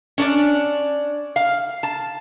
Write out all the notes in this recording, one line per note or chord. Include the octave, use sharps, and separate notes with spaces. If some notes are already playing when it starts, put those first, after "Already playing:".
C#4 D4 D5
F5
A5